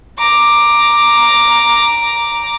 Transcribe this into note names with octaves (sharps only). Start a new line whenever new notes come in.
A#5 D6